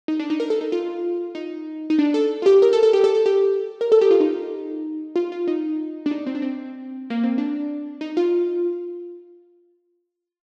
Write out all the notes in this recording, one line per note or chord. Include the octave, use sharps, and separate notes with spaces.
D#4
D4
D#4
A#4
A4
D#4
F4
D#4
D#4
D4
A4
F4
G4
A#4
A4
A4
G4
A4
A4
G4
A#4
A4
G4
F4
D#4
F4
F4
D#4
D4
D#4
C4
D4
C4
A#3
C4
D4
D#4
F4